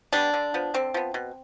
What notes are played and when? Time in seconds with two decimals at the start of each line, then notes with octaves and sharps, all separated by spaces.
0.13 G3 B3 D4
0.34 D3
0.54 F3 B3
0.74 D3 C4
0.94 F3 B3
1.14 B2